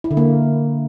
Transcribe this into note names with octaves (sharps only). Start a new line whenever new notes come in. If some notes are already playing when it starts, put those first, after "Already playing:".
E4
D3
A#3